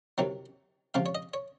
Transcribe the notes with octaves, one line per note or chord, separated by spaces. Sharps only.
C2 C3 D#3 F#3
C#2 C3 F3 F5
C#5
D#5
C#5